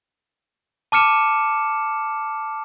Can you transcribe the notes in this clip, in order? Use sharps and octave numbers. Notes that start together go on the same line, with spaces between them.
A5 D6 F6 C#7 E7